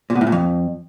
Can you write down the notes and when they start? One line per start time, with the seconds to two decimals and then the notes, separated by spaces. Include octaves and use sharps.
0.10 A#2
0.15 B2
0.21 A2
0.27 A#2
0.32 F2